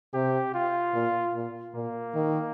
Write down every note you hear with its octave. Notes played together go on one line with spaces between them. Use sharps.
C3 G4
F4
A#2
A#2
A#2 A#3
D#3